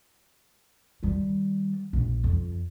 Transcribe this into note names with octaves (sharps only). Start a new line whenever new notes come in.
D#3 G3
A#1
F2